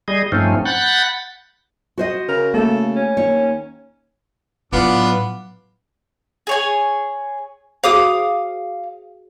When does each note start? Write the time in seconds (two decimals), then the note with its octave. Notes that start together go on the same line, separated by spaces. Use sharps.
0.08 G3 G#4 D#5
0.32 G2 F3 A3 C4 C#4 D#4
0.65 F#5 B5 F#6 G6 A6
1.98 F#4 C5 D#5
2.28 C#3 A#4
2.54 A3 A#3 A4
2.96 C#4
3.17 D#2 C#5
4.72 A2 F#3 B3 D4 F4
6.47 G#4 C#5 G#5
7.84 F#4 G#4 C5 F5 D6 D#6